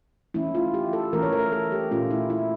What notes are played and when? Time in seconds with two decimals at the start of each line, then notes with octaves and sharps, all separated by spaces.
0.34 E3 A3 C#4 E4
0.55 F4
0.74 G4
0.93 A4
1.13 E3 A3 C#4 A#4
1.23 C#5
1.33 A#4
1.52 A4
1.72 G4
1.91 A#2 A3 C#4 F4
2.11 E4
2.30 E4